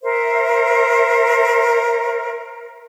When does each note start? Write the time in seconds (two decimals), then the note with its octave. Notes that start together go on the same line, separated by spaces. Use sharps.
0.03 A#4 C5 E5